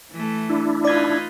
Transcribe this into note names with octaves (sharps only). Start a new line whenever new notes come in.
E3 A3
D4 E4
D#4 F4 B4 D5 G#6